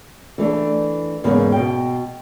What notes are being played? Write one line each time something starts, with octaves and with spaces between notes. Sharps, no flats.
E3 A3 D4 A4
E2 G#2 C#3 A#3 B3
B2 G5